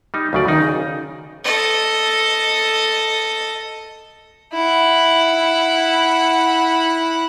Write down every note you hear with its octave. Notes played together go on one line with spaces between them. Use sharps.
G3 D#4
D2 C#3 F#3 D5
D#3 D#4
C#3
A4 D#5
E4 F#5